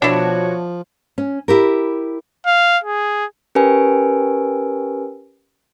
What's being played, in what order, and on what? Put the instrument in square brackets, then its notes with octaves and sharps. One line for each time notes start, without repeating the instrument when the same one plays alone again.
[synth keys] B2 F#4 [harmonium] F3 [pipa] D4 E4 [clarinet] C#5
[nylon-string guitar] C#4
E4 G4 A#4
[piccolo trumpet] F5
G#4
[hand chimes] C#4 G4 A#4 B4 G#5